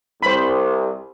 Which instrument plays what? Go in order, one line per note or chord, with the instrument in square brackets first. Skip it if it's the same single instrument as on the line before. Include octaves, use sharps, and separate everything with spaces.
[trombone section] C2 [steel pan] C5 B5